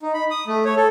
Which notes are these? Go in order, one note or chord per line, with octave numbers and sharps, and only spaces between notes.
D#4
B5
D#6
A3
C#5
A4